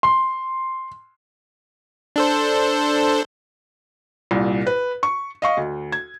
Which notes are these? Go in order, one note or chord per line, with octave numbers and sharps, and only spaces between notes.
C6
D4 A4 C5
C2 A#2
B4
C#6
D#5 F5 C#6
D2
G#6